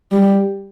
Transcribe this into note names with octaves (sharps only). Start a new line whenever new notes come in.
G3